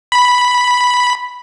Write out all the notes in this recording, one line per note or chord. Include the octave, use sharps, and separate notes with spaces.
B5